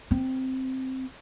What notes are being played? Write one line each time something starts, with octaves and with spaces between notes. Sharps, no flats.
C4